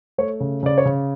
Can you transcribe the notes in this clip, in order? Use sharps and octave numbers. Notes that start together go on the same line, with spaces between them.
A3 C#5
C#3
C#3 D5
C#5
C#3